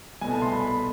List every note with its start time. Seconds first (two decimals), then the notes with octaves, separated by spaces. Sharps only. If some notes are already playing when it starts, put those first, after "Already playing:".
0.21 C2 B2 A3 G#5
0.31 A5
0.42 C6
0.52 B5
0.67 B5